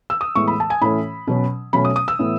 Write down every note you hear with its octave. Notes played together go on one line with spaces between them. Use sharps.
E6
D#6
A2 E3 G#3 B3 C#6
B5
A5
G#5
A2 E3 A3 C#4 B5
B2 F#3 C#4
B2 F#3 A3 C#4 B5
D#6
D#6
E6
A2 E3 B3